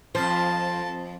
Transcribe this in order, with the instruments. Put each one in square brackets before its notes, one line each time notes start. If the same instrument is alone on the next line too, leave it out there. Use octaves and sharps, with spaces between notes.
[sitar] F2 C5 [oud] F3 [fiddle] A5